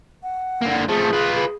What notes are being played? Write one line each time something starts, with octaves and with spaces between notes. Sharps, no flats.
F#5
D3 A#3
F3 A3 G#4
F4 B4
G#4